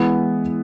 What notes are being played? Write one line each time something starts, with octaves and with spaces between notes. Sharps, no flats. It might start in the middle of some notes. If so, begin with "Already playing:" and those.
Already playing: E3 G#3 B3 E4 B4